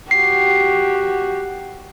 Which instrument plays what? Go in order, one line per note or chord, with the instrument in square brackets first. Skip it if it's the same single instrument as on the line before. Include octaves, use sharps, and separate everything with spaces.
[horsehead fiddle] F#4 G4 [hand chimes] C7